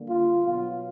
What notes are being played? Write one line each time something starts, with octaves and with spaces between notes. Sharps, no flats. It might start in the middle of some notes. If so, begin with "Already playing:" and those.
Already playing: D3 G3 A#3
F4
B2 F#3 B3 F4